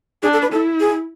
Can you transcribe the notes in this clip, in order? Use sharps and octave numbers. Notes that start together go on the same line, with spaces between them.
D4 G#4
A4
B4
E4 A4
G#4